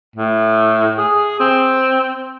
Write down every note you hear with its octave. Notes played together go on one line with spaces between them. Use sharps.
A2
G#4
C4